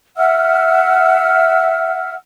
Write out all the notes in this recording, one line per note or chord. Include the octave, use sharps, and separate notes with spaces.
E5 F#5 E6 F6